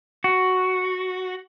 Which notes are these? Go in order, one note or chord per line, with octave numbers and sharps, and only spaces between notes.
F#4